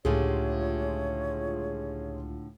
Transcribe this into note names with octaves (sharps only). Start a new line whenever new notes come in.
C#2 A2 D3 F4 G4 G#4 C#5